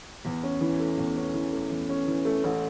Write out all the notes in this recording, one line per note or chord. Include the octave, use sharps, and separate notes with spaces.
E2
C#4
E3
A3
E2
C#4
E3
A3
E2
C#4
E3
A3
A1